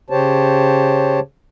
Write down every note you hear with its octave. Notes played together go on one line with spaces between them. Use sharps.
C#3 G4 C5 C#5 A5